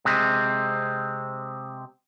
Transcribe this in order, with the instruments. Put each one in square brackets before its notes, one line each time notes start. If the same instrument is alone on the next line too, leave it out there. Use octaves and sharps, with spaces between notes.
[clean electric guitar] C3 G#3 C4